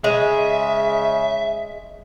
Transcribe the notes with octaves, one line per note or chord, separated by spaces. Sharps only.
C#3 G#3 E5